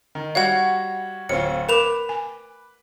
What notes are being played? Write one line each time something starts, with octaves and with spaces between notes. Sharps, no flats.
D#3
G3 F#4 C#5 F5 F#5
D1 C4 F4 C#5 C#7
A#4 B4 D6 E7 F7
G#5